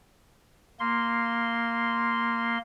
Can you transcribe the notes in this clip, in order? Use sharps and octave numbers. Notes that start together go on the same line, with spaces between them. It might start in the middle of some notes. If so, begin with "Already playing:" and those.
A#3 C6